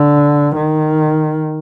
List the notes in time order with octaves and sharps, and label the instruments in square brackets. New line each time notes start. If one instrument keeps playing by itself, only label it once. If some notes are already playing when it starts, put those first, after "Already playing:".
Already playing: [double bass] D3
D#3